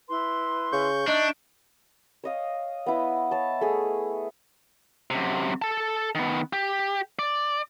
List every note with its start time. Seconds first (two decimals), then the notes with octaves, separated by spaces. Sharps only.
0.08 E4 B4 C6
0.73 C#3 C#6 G6
1.07 D4 D#4 E5
2.24 C#5 D#5 F5
2.86 B3 E4 D#5
3.31 C#5 A5
3.61 A3 G#4
5.10 F#2 C3
5.62 A4 A5
6.15 D#3 B3
6.53 G4
7.19 D5